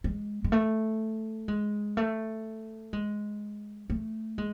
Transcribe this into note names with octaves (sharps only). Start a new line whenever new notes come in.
G#3
G#3
A3
G#3
A3
G#3
A3
G#3